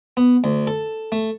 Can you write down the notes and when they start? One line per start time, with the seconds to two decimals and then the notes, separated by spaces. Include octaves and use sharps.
0.17 B3
0.44 D2
0.67 A4
1.12 A3